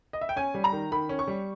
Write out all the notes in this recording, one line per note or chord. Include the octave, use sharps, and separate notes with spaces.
D#5
E5
G5
C#4 G#5
G3
A#5
D#3
D#3 B5
C#4
C#6
G3